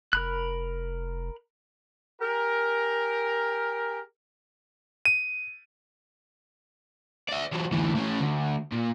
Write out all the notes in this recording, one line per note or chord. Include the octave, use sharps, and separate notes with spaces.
F1 A#4 B5 F#6
G4 G#4 A#4
D#7
D5 E5
E3 F#3
D2 E3
A2 C#4
D2
A#2